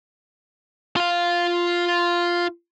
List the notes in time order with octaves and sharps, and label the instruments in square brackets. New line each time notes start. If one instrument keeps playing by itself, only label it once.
[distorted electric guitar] F4 F5